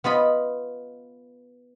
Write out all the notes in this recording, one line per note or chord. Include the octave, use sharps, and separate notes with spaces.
B3 F4 D#5 B5